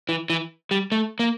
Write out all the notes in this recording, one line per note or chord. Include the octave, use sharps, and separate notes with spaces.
E3
E3
G3
A3
A#3